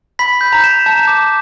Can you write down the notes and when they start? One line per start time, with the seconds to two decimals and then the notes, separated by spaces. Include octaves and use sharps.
0.19 B5 B6
0.41 G6
0.53 A#5
0.64 E7
0.86 A5 G6
1.08 D6